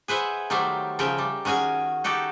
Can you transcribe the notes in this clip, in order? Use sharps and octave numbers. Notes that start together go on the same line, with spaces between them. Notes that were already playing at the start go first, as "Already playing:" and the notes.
G#4 B4 C5 E5 F#5
D#3 F#3 G3 A3 C5
C#3 F3 A#4 E5 G5
G3
D#3 C#4 F#4 G#4 G#5
D#4 F#4 G4 A4